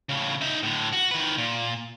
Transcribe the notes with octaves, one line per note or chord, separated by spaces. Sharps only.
A2 C#3
D#4 E5
A2 D3
F#4
D#3 B4
A#2